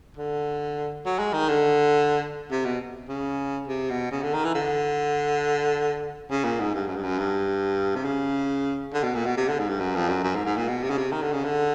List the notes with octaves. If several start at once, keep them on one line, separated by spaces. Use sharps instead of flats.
D3
F#3
G#3
D#3
D3
C3
B2
C#3
C3
B2
C#3
D3
D#3
E3
D3
C#3
A#2
G#2
G2
F#2
G2
F#2
G2
C3
C#3
D3
B2
A#2
B2
C3
D3
G#2
G2
F#2
F2
F#2
F#2
G#2
G#2
A#2
B2
C3
C#3
C3
D#3
D3
C#3
D3